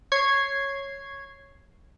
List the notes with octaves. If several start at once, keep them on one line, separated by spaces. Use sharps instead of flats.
C#5 G#6 C7